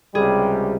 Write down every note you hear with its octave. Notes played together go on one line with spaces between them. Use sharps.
C#2 C3 G3 G#4